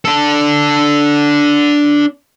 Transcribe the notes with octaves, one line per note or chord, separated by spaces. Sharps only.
D4 A4